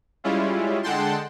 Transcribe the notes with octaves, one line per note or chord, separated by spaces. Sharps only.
G3 G#3 C#4 E4 F4
D3 G#3 F#5 G5 A5 C6